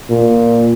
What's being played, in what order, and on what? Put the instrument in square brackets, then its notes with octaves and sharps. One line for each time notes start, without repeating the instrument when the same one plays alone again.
[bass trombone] A#2